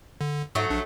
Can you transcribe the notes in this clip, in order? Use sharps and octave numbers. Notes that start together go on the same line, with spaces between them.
D3
G#2 F#3 A3
A#1 D4